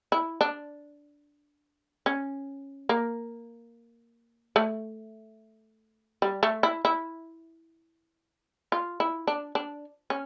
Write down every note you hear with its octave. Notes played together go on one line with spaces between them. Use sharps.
E4
D4
C#4
A#3
A3
G3
A3
E4
E4
F4
E4
D4
D4
C#4